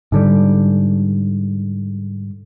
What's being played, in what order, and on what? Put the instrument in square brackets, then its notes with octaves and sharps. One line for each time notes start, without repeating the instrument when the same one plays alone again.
[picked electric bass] G#2 D3 G3